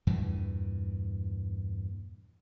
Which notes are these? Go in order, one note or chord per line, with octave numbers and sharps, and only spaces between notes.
E2 G2 A#2 E3